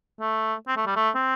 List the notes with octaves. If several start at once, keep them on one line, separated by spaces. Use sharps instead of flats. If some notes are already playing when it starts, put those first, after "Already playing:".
A3
C4
A3
G3
A3
C4